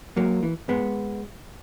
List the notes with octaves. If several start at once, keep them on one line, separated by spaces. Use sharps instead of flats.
G#2 F#3 A#3
E3
G#2 G#3 B3